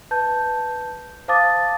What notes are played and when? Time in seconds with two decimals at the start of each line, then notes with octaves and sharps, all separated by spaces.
0.11 B4 A5 G6
1.28 C5 F5 A5 D6 D#6 A6